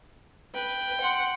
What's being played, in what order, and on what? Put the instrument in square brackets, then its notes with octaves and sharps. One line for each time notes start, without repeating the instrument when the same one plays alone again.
[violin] B4 [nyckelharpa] G5
[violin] F#5 C6